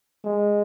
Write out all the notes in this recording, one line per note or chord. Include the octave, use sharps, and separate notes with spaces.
G#3